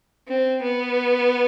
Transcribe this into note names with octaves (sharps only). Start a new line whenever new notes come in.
C4
B3